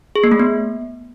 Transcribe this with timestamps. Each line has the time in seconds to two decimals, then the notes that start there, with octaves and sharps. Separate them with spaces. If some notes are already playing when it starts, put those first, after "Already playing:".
0.15 G#4
0.24 A#3
0.32 A3
0.40 B3